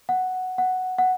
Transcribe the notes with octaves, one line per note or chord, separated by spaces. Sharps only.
F#5
F#5
F#5